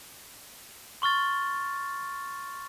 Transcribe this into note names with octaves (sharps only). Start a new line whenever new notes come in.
C6 C#6 F6 A6